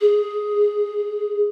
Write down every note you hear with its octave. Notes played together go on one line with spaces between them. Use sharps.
G#4